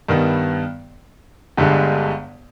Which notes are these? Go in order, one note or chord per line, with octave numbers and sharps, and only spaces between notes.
G2 D#3 G3 B3
G1 G2 D3 G#3